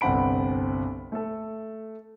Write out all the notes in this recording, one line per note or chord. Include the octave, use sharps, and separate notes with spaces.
G1 C2 C4 F#5 B5 D7
A3 A4